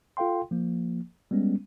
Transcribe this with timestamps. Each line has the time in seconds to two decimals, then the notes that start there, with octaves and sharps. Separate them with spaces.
0.17 F4 A4 F5 G5 C6
0.51 F3 A#3
1.31 G3 G#3 B3 C#4